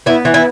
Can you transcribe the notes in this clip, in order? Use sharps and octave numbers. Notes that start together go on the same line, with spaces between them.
B3 E4
E3
E4